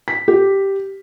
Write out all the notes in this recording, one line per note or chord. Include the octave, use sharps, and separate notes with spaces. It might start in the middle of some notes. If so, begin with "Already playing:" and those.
B6
G4